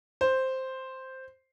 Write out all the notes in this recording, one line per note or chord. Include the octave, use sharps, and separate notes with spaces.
C5